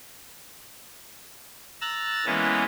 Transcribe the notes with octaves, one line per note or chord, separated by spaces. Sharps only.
A#5 E6 F#6 A6
E3 G#3 A#3 B3 C#4